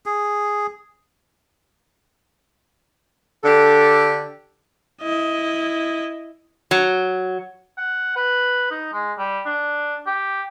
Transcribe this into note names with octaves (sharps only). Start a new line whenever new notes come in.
G#4
D3 D4 G4 A4
E4 D#5
F#3
F#5
B4
D#4
G#3
G3
D4
G4